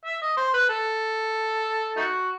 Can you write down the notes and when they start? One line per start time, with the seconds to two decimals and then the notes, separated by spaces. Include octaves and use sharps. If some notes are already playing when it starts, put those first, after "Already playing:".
0.06 E5
0.22 D#5
0.37 C5
0.54 B4
0.69 A4
1.96 A3 D#4 F#4